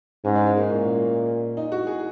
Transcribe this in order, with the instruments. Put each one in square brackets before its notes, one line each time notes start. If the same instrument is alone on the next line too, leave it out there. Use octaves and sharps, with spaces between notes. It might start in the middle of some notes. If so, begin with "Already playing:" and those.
[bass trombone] G#2 [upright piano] C#4
[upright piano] G#3
G#3
A#3
[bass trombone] A#2 [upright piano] C#4
[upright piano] D#4
F#4
G#4